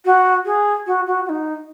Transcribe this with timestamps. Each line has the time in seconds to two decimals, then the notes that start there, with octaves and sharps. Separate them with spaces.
0.05 F#4
0.46 G#4
0.87 F#4
1.07 F#4
1.26 F#4
1.29 D#4